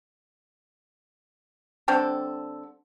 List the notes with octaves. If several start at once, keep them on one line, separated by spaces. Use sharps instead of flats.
D3 G3 C4 A4